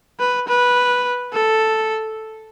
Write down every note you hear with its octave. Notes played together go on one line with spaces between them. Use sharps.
B4
B4
A4